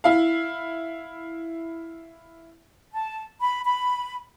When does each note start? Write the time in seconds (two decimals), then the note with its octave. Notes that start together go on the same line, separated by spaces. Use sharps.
0.04 E4 F5
2.93 A5
3.40 B5
3.65 B5